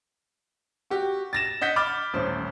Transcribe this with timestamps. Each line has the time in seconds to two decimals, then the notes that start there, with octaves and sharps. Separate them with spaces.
0.90 F#4 G4
1.33 A6 A#6 E7
1.61 D#5 F#5 G6 B6
1.76 B5 D6 F6 A6
2.13 D#1 A1 C#4 C5